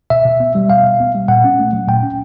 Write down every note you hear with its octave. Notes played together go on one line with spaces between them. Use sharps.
B2 E5
B2
B3
G3
B2 F5
B2
B3
G3
A#2 F#5
C#4
A3
F#3
A#2 G5
C#4